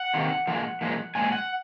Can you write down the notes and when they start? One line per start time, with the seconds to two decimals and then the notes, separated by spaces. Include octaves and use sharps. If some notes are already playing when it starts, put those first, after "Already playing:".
Already playing: F#5
0.14 C3 D#3 A#3
0.47 A#2 F3 G#3
0.81 A#2 F3 G#3
1.15 A#2 F3 G#3 G#5
1.32 F#5